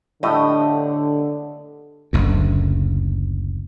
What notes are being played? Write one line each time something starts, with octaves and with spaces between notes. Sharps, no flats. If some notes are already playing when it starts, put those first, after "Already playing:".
A2 D3 A3 G4 D#5
F#1 D2